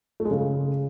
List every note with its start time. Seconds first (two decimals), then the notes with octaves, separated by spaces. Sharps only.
0.20 A3
0.25 G#3
0.31 C#3